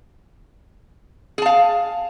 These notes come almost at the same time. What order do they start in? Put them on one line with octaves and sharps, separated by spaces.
G#4 A5 F5